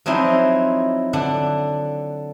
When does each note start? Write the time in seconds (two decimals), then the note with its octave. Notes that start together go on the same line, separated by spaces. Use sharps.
0.06 F3 F#3 C4 D#4 E4
1.13 D3 D4 F#5